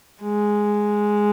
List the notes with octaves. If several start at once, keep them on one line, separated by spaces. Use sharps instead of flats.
G#3